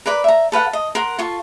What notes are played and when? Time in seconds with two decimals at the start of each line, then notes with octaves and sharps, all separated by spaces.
0.06 A#4 B4 D5 B5
0.24 E5 A#5
0.52 A4 B4 F5 F#5
0.73 D#5
0.95 A#4 F#5 C6
1.19 F4 A4 C#6